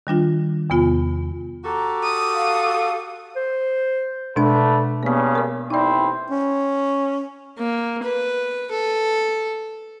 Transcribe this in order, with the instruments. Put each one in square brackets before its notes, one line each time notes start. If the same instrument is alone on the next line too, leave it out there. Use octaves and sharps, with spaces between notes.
[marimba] D#3 G3 D4 F4
E2 C3 B3 F4 G#5
[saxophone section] F#4 G4 A4 [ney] A#5
[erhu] D#6
[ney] F5
[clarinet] C5
[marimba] B2 G#3 D4 [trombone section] D3 A3 B4
[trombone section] G2 C#3 C#4 [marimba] A#3 B3
[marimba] A#4 C#5
[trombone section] A1 C4 E4 [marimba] D#4 D5
[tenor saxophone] C#4
[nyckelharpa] A#3
B4
A4